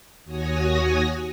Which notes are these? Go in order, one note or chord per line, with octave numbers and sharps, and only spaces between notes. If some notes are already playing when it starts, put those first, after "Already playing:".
D#2 F#4 C#5 G#5 D#6 A#6